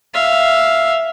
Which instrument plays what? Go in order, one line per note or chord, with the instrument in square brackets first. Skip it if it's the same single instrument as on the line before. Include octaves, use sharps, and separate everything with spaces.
[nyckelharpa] E5 F5